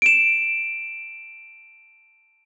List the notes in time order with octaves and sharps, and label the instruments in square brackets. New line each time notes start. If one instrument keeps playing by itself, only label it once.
[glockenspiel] D7 E7